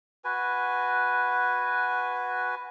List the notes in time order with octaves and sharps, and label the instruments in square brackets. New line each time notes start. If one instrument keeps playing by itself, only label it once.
[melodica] F#4 B4 G#5